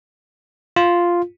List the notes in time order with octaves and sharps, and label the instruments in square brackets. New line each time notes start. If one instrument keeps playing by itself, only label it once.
[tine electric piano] F4